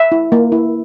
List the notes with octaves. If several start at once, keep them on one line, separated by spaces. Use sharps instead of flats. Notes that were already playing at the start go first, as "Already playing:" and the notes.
Already playing: E5
E4
A#3
E4